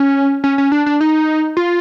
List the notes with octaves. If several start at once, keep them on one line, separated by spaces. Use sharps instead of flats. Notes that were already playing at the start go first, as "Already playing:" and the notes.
Already playing: C#4
C#4
C#4
D4
D4
D#4
F4